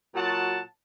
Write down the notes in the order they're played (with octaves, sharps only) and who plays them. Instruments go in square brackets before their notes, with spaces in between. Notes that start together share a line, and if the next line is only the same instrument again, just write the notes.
[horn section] A#2 F#3 F#4 F#5 A5